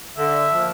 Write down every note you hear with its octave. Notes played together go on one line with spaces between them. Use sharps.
D3 E5
F3 A#3